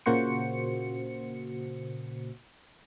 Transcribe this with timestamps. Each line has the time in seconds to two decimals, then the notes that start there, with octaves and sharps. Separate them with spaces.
0.06 A#2 C#3 A#3 F#4 C5 C#7